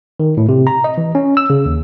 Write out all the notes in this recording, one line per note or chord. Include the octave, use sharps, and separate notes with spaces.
D#3
A2
C3
A#5
D#5
E3
C#4
E6
C#3
D#2